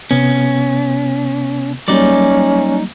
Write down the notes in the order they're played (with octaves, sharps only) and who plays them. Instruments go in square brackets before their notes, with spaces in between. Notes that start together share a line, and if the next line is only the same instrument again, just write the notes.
[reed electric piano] C3 B3 [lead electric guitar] C#4
[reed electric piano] F#3 G3 A#3 [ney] C#4 [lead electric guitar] D#4 D5